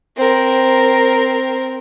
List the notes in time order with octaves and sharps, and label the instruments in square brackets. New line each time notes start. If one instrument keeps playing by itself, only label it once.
[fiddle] C4 A#4